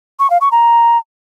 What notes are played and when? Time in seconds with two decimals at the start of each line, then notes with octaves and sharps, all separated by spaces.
0.19 C#6
0.30 F5
0.41 C#6
0.52 A#5